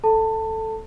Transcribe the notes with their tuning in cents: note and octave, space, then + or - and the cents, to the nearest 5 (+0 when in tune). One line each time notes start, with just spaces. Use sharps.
A4 +0 A5 +20